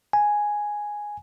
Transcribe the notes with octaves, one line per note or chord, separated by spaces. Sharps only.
G#5